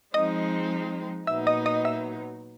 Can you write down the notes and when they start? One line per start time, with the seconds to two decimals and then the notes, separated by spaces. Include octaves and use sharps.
0.14 F3 G#3 C4 D#4 D#5 D#6
1.27 A#2 F#3 B3 D#4 E5 E6
1.47 D#5 D#6
1.66 D#5 D#6
1.85 E5 E6